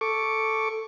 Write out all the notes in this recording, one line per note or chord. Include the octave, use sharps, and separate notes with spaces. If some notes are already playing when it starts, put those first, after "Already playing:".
A4 C#6 D6